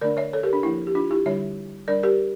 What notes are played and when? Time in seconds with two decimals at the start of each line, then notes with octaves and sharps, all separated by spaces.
0.01 D3 A3 D4 A#4 D5
0.17 C#5 E5
0.33 A4 C#5
0.43 G4 A#4
0.53 D4
0.63 F3 A#3 D4 E4
0.87 G4
0.95 D4 F4
1.11 E4 G4
1.26 D3 G3 D4 C#5 E5
1.88 G3 D4 A#4 D5
2.03 G4 A#4